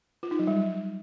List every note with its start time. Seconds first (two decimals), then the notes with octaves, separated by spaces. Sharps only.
0.23 F4
0.31 D#4
0.39 F#3
0.47 G3